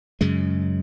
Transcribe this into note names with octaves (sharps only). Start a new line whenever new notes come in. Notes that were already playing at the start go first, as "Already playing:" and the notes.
F#2 C#3 G#3